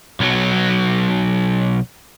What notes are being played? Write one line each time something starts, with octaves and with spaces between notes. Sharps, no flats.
B1 F#3